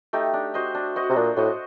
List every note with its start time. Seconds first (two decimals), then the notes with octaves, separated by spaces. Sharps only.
0.13 A3 D#4 G4
0.34 D4
0.54 F#4 C5 D#5
0.75 D4
0.96 F#4 C5 D#5
1.10 C3
1.16 A#2 D4
1.36 A2 F#4 C5 D#5